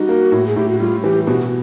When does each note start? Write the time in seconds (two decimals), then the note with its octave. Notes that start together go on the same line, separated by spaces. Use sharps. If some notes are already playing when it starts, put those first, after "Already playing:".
Already playing: G3 D#4 F#4
0.09 A#3
0.32 A2
0.47 G#4
0.56 A2 G4
0.69 F#4
0.79 G3 F4
1.04 E3 G4
1.27 B2 F#4